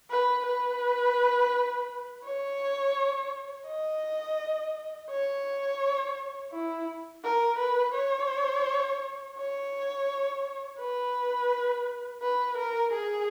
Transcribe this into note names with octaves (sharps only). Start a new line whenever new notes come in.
B4
B4
C#5
D#5
C#5
E4
A#4
B4
C#5
C#5
B4
B4
A#4
G#4